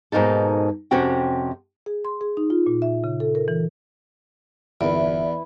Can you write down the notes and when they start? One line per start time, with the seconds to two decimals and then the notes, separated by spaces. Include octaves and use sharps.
0.12 G#2 B2 A#3 D#4 A4
0.91 F2 C3 C#4 F#4 G5
1.86 G#4
2.05 C6
2.21 G#4
2.37 D#4
2.50 F4
2.66 A#2
2.82 E5
3.04 C#3
3.20 A4
3.35 A#4
3.48 E3
4.81 G1 E2 E4 B4 D5